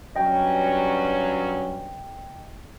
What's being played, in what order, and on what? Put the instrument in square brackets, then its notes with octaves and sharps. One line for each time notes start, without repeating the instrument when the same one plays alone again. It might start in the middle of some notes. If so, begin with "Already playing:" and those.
[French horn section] G2 F#3 C#4 [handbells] D#5 G5